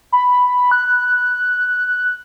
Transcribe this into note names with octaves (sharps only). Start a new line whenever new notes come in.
B5
F#6